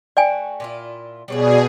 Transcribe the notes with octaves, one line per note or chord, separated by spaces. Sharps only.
A3 F#4 D5 G5 G#5
A#2 E4 F4
B2 G3 G#4 C#5 D5